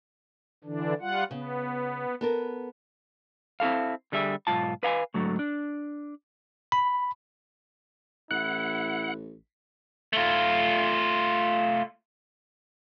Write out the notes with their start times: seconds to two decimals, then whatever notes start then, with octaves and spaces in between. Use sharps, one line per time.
0.64 D3 E3 D4
1.01 G3 F4 F#5
1.31 C#3 B3
2.21 B3 A4 A#4
3.60 C4 E4 A4 F5
4.12 D3 G3 G#4 E5
4.47 B1 G#2 F4 A5
4.83 B4 F5 G5 G#5
5.14 G#2 D3 F#3 A3
5.39 D4
6.72 B5
8.31 A1 E4 F#5 F#6
10.13 A3 F4